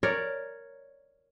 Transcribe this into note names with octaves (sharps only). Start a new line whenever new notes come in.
A#4 C#5 D5